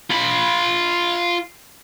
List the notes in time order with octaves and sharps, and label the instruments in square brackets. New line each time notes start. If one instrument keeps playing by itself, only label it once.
[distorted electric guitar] F4 B5